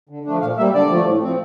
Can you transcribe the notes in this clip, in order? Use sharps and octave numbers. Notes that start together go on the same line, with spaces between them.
D3
F3 A3 D4
A#2 F5
G3 A#3 E5
D3 D5
F3 A3
A2
F3 C4